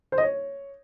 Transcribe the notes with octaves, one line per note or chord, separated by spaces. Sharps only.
C5
D#5
C#5